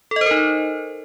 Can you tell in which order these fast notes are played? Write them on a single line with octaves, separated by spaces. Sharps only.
A4 D#5 C5 A#4 D#4